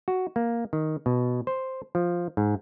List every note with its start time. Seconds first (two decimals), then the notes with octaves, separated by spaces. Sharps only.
0.08 F#4
0.36 A#3
0.73 D#3
1.06 B2
1.47 C5
1.95 F3
2.37 G#2